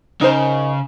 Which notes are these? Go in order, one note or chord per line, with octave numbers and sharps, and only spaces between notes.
C#3 D#4 A#4 C5